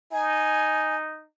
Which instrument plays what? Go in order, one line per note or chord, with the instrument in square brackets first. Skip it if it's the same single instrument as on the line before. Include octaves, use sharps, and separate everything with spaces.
[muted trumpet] D#4 [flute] G#5